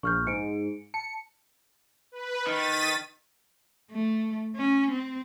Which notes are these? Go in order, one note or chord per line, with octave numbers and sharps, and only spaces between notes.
A#1 C#6 F6 G6
G#2 C#7 D7
A5 C#7
B4
D#3 A6 B6 D#7
A3
C#4
C4